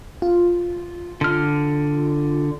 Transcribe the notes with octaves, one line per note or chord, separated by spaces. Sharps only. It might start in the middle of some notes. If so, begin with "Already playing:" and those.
F4
D3 F6